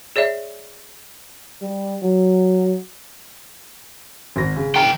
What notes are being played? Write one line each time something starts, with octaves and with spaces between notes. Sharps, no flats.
G#4 C#5 D5 E5
G3
F#3
G#1 A#6
C#3
E3 G5 A#5